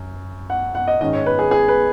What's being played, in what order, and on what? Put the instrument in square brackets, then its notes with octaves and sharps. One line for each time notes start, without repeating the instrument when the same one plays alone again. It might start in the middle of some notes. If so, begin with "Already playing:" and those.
Already playing: [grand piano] F#2
F#5
F#5
D#5
G#2 D#3 G#3 C#4 D#5
C#5
B4
G#4
G#4
B4